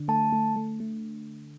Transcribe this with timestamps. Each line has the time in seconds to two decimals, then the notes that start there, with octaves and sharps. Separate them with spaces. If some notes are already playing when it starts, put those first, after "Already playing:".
Already playing: D3 D4
0.08 A3 A5
0.32 A3
0.56 A3
0.80 A3